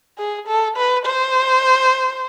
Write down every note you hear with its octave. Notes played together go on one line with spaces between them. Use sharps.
G#4
A4
B4
C5